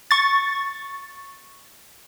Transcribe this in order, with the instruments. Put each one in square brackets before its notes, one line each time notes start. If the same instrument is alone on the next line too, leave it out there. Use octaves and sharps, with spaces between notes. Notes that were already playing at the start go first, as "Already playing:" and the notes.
[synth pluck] C#6 A6